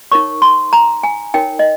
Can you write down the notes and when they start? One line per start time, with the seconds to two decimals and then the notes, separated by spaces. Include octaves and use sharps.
0.11 D#4 A#4 C#5 C#6
0.42 C6
0.73 A#5
1.03 G#5
1.34 D#4 A#4 C#5 G5
1.59 D#5